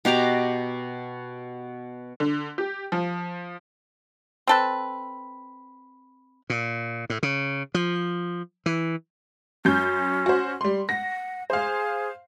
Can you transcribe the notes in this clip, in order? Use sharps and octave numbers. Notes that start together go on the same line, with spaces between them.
B2 G4 A#5 D6
D3
G4
F3
C4 A4 B4
A#2
A2
C#3
F3
E3
F#2 C#4 G6
F#4 C5
G3 C6
F#5 A#6
G#4 C5 F5